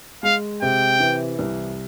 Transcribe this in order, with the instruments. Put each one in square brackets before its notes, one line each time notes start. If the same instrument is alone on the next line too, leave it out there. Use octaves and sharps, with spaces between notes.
[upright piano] G#3 [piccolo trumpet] F5
[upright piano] C3 [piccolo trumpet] G5
[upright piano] E3
C2